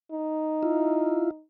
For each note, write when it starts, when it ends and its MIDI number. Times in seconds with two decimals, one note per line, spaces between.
0.12 1.42 63
0.63 1.31 64
0.63 1.31 65